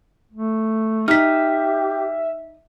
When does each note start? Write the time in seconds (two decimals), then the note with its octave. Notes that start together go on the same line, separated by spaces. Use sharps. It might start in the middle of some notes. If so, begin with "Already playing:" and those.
0.32 A3
1.08 D#4 G4 E5 F6 B6